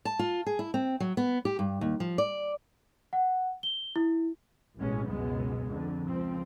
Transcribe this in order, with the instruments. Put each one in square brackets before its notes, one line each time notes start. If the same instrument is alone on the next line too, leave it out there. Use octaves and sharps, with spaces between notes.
[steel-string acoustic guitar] A5
F4
G#4
E4
C4
F#3
B3
G4
G2
D#2
F3
D5
[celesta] F#5
G7
E4
[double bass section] A1 B2 G#3 C#4
C#2 F#2 B2 G#3 B3
F2 D3
C#2 F3 C4